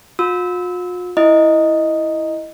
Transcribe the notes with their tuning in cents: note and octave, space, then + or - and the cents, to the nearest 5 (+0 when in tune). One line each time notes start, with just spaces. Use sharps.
F4 +45 E6 -25
E4 +0 D#5 +0